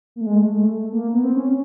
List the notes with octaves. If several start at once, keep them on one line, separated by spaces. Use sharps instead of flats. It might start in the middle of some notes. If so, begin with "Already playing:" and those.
A#3
A3
G#3
A3
G#3
A3
A3
A#3
B3
C4
C#4
C#4